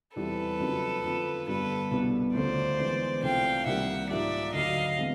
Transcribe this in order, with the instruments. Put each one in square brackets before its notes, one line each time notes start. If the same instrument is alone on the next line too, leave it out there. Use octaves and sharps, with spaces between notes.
[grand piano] E2 C3 E3 G3 C4 [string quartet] A4 B4
[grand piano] F2 C#3 F#3 A#3 D#4
F2 D3 F3
[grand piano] G2 D3 G3 B3 [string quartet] A4 B4
[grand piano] C2 B2 G3 B3
[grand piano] D2 C#3 F3 A3 C#4 [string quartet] C5 D5
[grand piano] E3 G#3 B3
[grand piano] C2 C3 F3 A3 D4 [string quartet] F5 G5
[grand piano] C2 C3 D#3 G3 A#3 [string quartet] E5 F#5
[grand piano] G#2 F3 A#3 D4 G4 [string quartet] D5 E5
[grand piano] D2 D3 F#3 [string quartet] D#5 F5
[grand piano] C3 E3 G#3 B3